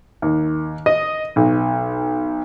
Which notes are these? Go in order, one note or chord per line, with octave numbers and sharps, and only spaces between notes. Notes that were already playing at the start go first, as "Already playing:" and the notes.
D#2
D#5
B1